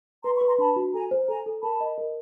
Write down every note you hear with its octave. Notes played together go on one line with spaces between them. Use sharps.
B4 A#5 C6
B5 C#6
B4
A#5 C6
D4 A5 B5
F#4
A4 G#5 A#5
C5
A4 G#5 A#5
A4
A#4 A5 B5
D#5
A#4